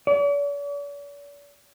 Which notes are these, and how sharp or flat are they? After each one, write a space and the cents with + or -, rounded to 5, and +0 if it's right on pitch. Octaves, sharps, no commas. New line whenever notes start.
D5 -45